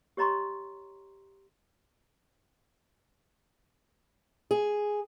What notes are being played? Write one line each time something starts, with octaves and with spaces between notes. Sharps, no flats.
G4 C#5 D#5 A#5 C6 C#6
G#4